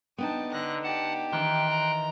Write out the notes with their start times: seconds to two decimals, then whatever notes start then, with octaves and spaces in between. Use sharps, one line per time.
0.18 B3 D4 D#4 G5 A5
0.52 D3 F#6 A#6
0.84 G4 F#5 A5
1.32 D#3 E3 G5 C6 F#6
1.69 A#5